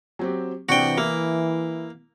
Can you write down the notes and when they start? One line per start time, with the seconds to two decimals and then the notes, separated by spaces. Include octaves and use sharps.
0.19 F#3 C4 G4
0.69 C3 E3 C4 D4 F#4 G5
0.98 A#3 E4